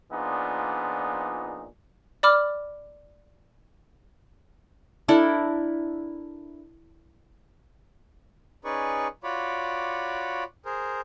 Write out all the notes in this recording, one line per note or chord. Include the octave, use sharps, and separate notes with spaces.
A#2 F3 B3 D4 D#4 G#4
D5 B5 D6 F6
D4 E4 A4 A#4
C#4 D#4 G#4 B4 D5 C#6
F4 F#4 C#5 D5 B5 D6
G#4 A#4 C5